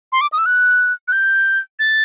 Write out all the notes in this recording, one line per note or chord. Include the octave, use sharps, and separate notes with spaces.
C6
D6
D#6
E6
F#6
F#6
G6
A6